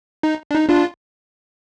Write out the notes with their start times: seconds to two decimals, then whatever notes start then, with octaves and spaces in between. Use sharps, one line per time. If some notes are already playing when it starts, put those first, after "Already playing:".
0.23 D#4
0.51 D4
0.54 D#4
0.69 D4 F4